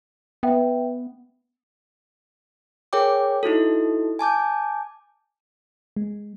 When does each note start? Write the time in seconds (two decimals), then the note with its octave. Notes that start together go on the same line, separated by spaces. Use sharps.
0.43 B3 B4 E5 G5
2.93 G#4 A#4 C#5 G5 D6
3.43 D#4 E4 F#4 A4
4.19 G#5 A5 D6 G6
5.96 G#3